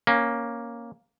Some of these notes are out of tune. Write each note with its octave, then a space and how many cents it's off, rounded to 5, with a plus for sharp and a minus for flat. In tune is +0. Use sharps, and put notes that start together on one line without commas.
A#3 +5 C#4 +0